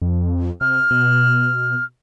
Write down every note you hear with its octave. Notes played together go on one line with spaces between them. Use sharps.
F2
C3 F6
B2